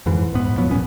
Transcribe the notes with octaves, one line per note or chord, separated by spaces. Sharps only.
F2 G#2 E3
D#1 G#2 B3
F3 F#3 B3
D#1 A#1 B3 C#4